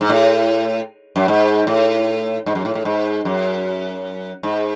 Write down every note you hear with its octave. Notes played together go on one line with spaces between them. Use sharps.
G#2
A2
F#2
G#2
A2
G#2
F#2
A2
A2
G#2
F#2
G#2